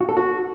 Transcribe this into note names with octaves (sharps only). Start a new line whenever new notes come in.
F#4
A4
F#4